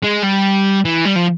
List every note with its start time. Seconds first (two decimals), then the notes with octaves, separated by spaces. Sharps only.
0.04 G#3
0.24 G3
0.85 E3
1.05 G3
1.16 F3